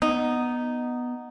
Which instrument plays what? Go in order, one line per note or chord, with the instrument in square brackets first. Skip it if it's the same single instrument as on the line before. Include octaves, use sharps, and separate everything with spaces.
[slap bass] B3 [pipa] D#4